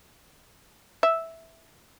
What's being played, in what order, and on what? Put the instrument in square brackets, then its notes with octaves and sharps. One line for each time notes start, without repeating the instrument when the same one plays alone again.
[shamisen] E5